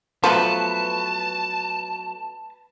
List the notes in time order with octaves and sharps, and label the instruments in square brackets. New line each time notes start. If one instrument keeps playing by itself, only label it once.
[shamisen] F3 [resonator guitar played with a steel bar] F#3 A3 B3 [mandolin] B4 [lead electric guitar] A5